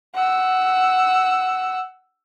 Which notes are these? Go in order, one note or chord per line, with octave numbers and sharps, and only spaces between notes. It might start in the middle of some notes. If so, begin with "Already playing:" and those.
F#5 E6